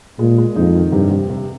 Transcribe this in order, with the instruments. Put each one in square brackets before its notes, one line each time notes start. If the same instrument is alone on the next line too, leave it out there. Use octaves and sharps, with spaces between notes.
[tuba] A#2 [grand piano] G#3
[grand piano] G#3
[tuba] F2 [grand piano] D#4
[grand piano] D#3
[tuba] G2 [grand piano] C3
[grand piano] C3
C3